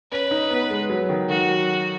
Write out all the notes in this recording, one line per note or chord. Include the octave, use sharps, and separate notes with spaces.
C#4 B4
D#4
B3
G#3
F#3
D#3
D#3 F#4
F#3